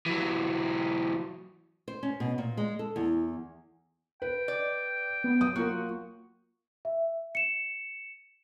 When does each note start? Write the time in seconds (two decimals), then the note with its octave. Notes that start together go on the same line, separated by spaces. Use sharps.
0.06 E3 F#3
1.88 C5
2.03 C#4
2.20 B2
2.38 A#2
2.57 G#3
2.79 A4
2.96 E2
4.22 B4 G5
4.48 D5
5.24 B3
5.41 F#3 D#6
5.56 A#3 F4 F#4 A#4
6.85 E5
7.35 C#7 E7